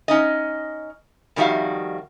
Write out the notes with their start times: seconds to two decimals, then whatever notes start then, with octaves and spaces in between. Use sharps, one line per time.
0.08 C#4 D#4 D#5
1.36 F2 D#3 G3 F#4 E5 F5